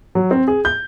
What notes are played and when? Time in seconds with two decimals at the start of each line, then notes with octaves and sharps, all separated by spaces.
0.15 F#3
0.31 C4
0.48 G#4
0.65 G6